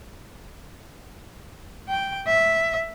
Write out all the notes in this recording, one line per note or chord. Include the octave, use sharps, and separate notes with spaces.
G5
E5